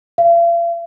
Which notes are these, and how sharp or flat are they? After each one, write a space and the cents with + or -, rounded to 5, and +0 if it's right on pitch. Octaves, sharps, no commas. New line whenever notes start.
F5 -45